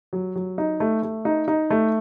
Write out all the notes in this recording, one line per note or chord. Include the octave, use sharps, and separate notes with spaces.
F#3
F#3
D#4
A3
A3
D#4
D#4
A3